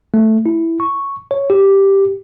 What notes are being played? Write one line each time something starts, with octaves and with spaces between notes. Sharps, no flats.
A3
E4
C#6
C#5
G4